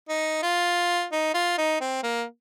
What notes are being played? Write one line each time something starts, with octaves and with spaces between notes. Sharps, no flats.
D#4
F4
D#4
F4
D#4
C4
A#3